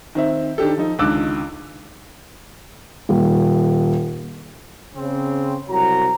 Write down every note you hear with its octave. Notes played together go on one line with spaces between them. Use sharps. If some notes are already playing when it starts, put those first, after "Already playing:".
D#3 C4 E5
D#3 D4 G4 A4
F3 D#4
C#2 D3 D#3 D6 E6 F#6
D#1
C#3 C4
C2 F#3 A#5